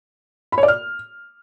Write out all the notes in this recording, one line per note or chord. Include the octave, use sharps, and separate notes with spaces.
B5
C#5
D5
F6